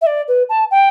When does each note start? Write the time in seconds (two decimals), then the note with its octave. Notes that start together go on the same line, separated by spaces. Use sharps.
0.02 E5
0.07 D5
0.28 B4
0.49 A5
0.71 G5